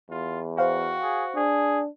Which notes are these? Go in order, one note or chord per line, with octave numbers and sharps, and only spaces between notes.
E2 F4
F#4 C5 F5 G5
G#4
D4 G#4